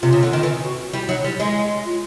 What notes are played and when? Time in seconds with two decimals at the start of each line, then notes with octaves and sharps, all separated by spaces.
0.02 C3 F4
0.13 C#3
0.23 D3
0.33 D#3
0.43 E3
0.64 F#4
0.93 G3 E4
1.09 F#3 D#4
1.24 G3 E4
1.40 G#3
1.86 F4